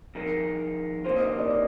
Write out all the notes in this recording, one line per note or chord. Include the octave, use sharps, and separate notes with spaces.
F2 D#3 G#3 C4 D#4 A#4
C3 D#3 A#3 F4 C5
D#5
D#5
D5
D#5